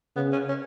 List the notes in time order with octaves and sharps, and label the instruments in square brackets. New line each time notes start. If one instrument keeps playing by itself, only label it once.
[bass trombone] C#3 [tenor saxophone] B3
[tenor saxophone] C#4
C#4